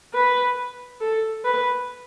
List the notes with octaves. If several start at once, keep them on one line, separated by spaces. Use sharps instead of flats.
B4
A4
B4